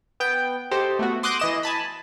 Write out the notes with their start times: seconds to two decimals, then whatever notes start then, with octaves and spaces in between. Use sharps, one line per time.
0.20 B3 G5 G6
0.71 G4 A4 C5 D#5
0.99 A3 B3 F#4
1.23 C6 D6 D#6 F#6 G6 A#6
1.39 E3 D#5 E7
1.63 G#5 A5 B5